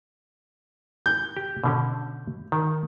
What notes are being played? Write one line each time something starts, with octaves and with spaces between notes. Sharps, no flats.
G6
G4
B2 D3 C#4
D#3